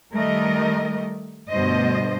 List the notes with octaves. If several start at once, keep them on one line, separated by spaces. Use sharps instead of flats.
D#3 G3 A3 A#4 D#5
G2 B2 D3 A3 C5 D#5